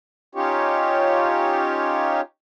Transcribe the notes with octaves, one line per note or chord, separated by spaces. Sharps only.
C#4 D#4 F4 G4 C#5